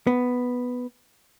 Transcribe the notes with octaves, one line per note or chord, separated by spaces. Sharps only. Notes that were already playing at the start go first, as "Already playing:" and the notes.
B3